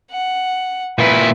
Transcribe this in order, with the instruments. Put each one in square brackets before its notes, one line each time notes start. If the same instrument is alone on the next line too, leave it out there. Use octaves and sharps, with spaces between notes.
[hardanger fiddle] F#5
[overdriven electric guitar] A#2 E4 [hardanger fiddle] B4